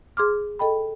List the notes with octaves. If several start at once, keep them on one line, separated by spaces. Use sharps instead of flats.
G#4 C6 D6 F6
A4 D#5 G5 B5